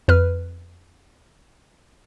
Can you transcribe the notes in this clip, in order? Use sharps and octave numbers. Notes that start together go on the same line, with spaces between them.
F2 B4 F6